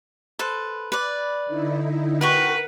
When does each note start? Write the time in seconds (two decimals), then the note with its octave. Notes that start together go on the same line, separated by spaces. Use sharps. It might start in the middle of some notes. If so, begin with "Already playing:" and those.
0.39 A4 B4 C5
0.92 B4 D5
1.46 D3 D#4 E4
2.21 F#4 A#4 B4 F#5 G5 C#6